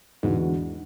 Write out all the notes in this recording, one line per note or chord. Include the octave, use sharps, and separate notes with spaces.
E2 G#2 D3 G#3 B3 F#4